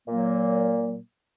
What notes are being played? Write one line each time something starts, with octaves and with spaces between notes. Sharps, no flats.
A#2 F#3 A#3